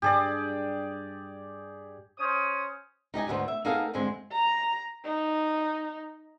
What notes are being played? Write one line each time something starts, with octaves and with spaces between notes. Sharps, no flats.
G2 G4 G#4 D5
C#4 C5 D#6
D#4 G4 D#5 G#5
D2 G#2 D3 B3 C5
E5
A#3 B3 D#4 G#4 A4 F5
E2 G2 D3 G#3 C4 G#5
A#5
D#4